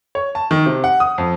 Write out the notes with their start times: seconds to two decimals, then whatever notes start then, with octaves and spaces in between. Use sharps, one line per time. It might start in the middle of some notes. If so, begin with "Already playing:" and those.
0.15 C#5
0.35 A5
0.51 D#3
0.66 C3
0.84 F#5
1.00 D#6
1.18 F2